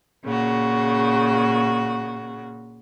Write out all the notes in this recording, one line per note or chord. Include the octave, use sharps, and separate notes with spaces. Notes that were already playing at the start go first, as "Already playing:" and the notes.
A#2 C#3 F#4